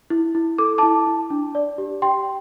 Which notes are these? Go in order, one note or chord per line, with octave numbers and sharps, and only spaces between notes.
E4
E4
A4 D6
E4 A5 D6
E4
D4
D5
G4
G4 G5 C6